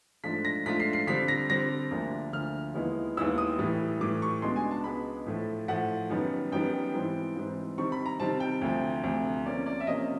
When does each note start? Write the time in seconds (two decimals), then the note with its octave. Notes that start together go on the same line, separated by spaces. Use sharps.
0.24 G#2 F3 A3 D4 F4 B6
0.45 A#6
0.65 G#2 F3 A3 D4 F4 B6
0.80 C7
0.93 C7
1.07 D3 G3 C4 B6
1.28 A#6
1.50 D3 G3 C4 A#6
1.91 D2 D3 F3 A#3 D4
2.32 D2 D3 F3 A#3 D4 F6
2.74 D#2 D#3 G#3 B3 E4
3.17 D#2 D#3 G#3 B3 E4 E6
3.38 D#6
3.59 A2 E3 G3
4.01 A2 E3 G3 D6
4.22 C#6
4.42 C#2 B2 G#3 B3 D4 C6
4.56 G#5
4.71 A5
4.84 C#2 B2 G#3 B3 D4 B5
5.26 A2 F3 A3
5.68 A2 F3 A3 F#5
6.10 F#2 D#3 G3 B3
6.52 F#2 D#3 G3 B3 G5
6.94 G#2 E3 G3 C4
7.36 G#2 E3 G3 C4
7.78 C3 D#3 G3 C4 C#6
7.92 B5
8.06 A#5
8.20 C3 D#3 G3 C4 A5
8.40 G5
8.62 D2 C3 F3
9.04 D2 C3 F3
9.45 C3 F3 A#3 C#4 D5
9.66 D5
9.80 E5
9.87 C3 F3 A#3 C#4 D#5